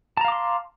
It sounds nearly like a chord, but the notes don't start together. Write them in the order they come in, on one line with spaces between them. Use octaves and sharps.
A5 A#5 F5 D6 C6